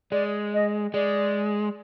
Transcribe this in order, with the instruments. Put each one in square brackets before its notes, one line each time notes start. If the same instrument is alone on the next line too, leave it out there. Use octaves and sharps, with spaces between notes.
[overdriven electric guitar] G#3 [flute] D5
[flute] D#5
[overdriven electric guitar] G#3 [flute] D5